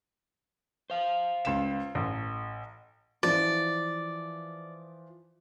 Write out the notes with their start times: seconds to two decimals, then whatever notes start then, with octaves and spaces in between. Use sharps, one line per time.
0.90 C5 F5
1.45 C#2 E7
1.95 A1
3.23 E3 F3 D5